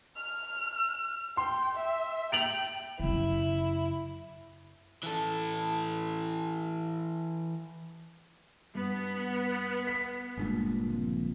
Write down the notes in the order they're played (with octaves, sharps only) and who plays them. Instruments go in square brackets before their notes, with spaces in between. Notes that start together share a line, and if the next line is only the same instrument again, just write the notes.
[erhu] F6
[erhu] G5 [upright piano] C6
[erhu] E5
[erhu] G5 [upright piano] D7 F7 F#7
[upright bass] F#2 C#3 [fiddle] E4
[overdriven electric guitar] E3 A4
[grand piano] G2 [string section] B3
[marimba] F#5 [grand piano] B6
[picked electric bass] G1 G2 A#2 [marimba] G#3
[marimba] C#3 F3 C4